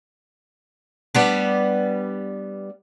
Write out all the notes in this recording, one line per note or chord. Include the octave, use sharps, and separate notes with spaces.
G3 B3 D4